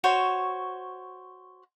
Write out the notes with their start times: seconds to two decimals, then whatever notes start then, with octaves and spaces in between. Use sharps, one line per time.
0.04 F#4 C5 C#5